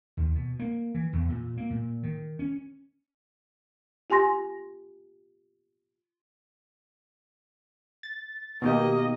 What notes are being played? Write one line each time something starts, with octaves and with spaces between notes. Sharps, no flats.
D#2
B2
A#3
E3
E2
A#2
A#3
A#2
D#3
C#4
F4 G4 G#5 C6 A#6
A6
B2 D#3 A#3 G4 D#5